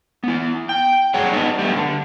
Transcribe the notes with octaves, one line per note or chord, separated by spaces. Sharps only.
B3 E4
G5
G2 F#3 G#4 C#5 F#5
B3 D4 D#4
G3 A3 B3
D3